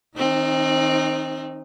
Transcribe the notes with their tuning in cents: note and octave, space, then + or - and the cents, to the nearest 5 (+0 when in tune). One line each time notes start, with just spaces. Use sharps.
D#3 +30 C4 +25 D#4 -15